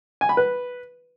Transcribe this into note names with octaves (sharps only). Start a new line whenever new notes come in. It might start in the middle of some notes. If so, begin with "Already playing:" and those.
G#5
B5
B4